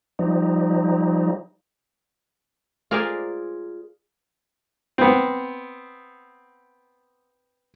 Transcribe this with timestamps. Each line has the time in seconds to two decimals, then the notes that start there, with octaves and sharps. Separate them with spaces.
0.19 F3 G3 D#4
2.91 F4 G#4 A#4 C5 D5 G#5
4.98 B3 C4